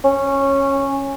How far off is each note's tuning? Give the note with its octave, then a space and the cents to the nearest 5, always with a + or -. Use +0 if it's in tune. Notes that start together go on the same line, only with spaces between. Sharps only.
C#4 -10